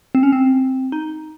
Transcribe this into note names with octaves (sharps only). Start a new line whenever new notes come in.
C4
C#4
C4
D#4